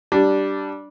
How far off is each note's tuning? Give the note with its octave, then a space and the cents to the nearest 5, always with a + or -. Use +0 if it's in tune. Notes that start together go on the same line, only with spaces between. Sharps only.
G3 -15 D4 +0